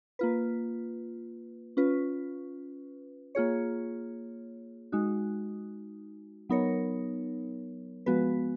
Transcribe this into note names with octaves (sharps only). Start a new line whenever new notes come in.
A#3 F4 B4
C#4 F4 B4
A#3 F4 G#4 C#5
G#3 D#4 F#4
F#3 B3 D#4 A#4 C#5
F3 G#3 B3 F#4 B4